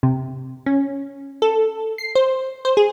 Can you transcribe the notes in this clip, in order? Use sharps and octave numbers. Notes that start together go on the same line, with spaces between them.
C3
C#4
A4
C7
C5
C5
G#4